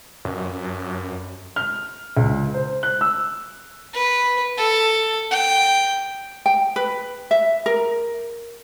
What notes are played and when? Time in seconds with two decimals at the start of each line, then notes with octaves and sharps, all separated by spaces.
0.25 F#2
1.56 F6
2.17 C#2
2.54 C5
2.83 F#6
3.01 E6
3.93 B4
4.57 A4
5.31 G5
6.46 G5
6.76 B4
7.31 E5
7.66 A#4